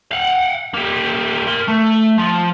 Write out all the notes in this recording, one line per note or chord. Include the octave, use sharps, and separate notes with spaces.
F5 F#5
G3 A#3
A#4 C6
A3
F3